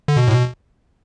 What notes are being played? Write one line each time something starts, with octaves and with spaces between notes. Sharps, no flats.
D3
B2
A2
B2